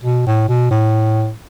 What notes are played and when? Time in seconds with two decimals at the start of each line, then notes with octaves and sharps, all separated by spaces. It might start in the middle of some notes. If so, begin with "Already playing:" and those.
0.04 B2
0.27 A2
0.49 B2
0.71 A2